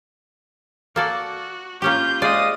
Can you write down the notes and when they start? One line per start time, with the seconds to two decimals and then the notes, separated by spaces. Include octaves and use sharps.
0.96 A#3 F#4 A4 D5
1.82 A#3 C#4 F4 G4 G6
2.22 G#3 C5 D5 F5 D#6